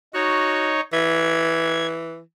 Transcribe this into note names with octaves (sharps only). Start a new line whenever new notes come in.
D#4 F#4 C#5
E3 G#6